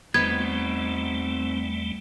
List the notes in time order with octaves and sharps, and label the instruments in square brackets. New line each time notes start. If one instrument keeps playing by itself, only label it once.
[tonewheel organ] E2 G3 A3 [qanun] B3 [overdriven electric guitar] C4 D#4 [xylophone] G#6